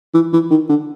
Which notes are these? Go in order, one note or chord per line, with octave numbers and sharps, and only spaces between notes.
E3
E3
D#3
D3